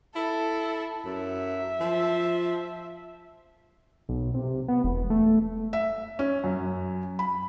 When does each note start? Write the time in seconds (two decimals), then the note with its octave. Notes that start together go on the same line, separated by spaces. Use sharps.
0.16 E4 A4
1.05 F#2 E5
1.80 F3
4.09 B1
4.34 C3
4.68 B3
4.84 E1
5.10 A3
5.73 E5
6.19 C#4
6.44 F#2
7.19 B5